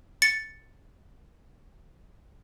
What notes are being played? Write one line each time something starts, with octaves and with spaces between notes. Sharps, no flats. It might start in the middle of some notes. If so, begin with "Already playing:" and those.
A6 C#7